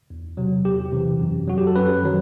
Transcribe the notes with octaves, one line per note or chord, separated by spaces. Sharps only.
E2
C3 F#3
E2 G4
C3 E3
F#2
F#3 F#4
G4
A4
F#2 B4
D#3 F#3